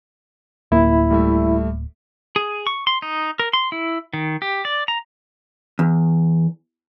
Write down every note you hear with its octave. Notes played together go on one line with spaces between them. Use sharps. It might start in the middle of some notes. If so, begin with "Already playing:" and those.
D1 A#3 E4
G3 A3 E5
G#4
C#6
C6
D#4
A#4
C6
E4
D#3
G4
D5
A#5
E2